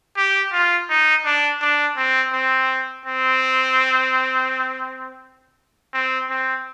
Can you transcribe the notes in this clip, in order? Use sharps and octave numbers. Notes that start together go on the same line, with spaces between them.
G4
F4
D#4
D4
D4
C4
C4
C4
C4
C4